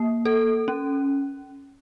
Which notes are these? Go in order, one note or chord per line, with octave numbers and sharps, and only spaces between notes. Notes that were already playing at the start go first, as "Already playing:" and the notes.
Already playing: A#3
A4
C#4